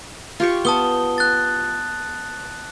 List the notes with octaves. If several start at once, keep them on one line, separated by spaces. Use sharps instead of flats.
F4 G4 C#6
B3 A5 D#6 G7
F#6 A6